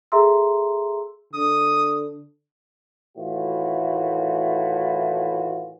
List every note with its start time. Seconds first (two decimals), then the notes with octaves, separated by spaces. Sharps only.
0.12 G#4 A4 E5 A#5 C6 E6
1.33 D3 D#6
3.18 A2 D#3 E3 A3 F4 F#4